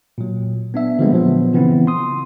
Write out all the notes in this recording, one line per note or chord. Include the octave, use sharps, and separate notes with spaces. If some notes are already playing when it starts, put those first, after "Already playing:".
A#2 F#3
B3 D4 E5
D3 F3 G3 G#3 A#3 B3
A#2 F3 F#3 B3
C#3 E3 B3 C4 E4
C6 D#6